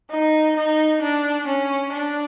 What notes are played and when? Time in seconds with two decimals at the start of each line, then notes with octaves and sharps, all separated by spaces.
0.11 D#4
0.57 D#4
1.02 D4
1.47 C#4
1.93 D4